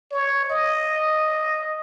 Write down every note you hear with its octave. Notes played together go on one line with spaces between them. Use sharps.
C#5
D#5